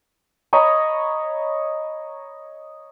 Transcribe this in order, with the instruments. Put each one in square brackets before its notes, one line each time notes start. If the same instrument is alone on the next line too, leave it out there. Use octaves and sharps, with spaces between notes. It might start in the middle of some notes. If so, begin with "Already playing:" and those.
[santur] C#5 D#5 A#5 B5